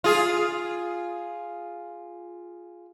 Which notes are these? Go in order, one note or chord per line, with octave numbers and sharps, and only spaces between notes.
F4 G#4